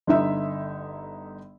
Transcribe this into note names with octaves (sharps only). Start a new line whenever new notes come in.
G1 D3 D#4 E5 E6